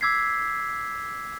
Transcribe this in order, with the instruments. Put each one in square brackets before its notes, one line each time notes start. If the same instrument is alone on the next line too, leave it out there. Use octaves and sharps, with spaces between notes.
[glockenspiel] D6 E6 G#6 B6 C7